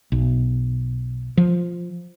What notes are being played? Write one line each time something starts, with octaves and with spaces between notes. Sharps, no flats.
B1
F3